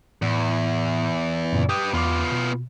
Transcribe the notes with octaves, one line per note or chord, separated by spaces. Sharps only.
E2 A2
F#2 A#2 C#3
G4 B4 D#6
E2 B3 F4 D6
B2